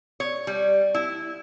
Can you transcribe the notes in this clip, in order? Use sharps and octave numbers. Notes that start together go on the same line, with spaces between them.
C#5
G3
E4